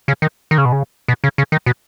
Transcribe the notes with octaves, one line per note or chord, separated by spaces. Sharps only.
C#3
D#3
D#3
C#3
B2
C#3
B2
C#3
C#3
D#3
B2